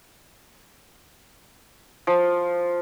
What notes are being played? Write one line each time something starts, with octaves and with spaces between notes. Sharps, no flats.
F3